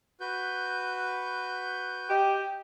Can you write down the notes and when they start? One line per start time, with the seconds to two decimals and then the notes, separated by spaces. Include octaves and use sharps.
0.20 F#4 B4 G6
2.09 G4 D#5